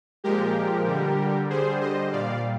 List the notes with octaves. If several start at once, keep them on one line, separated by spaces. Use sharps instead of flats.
A#2 F3 G#3 G4 A#4
D3 G3
D3 G3 G#4 C5
C5 D#5
A#2 G3 D5 F5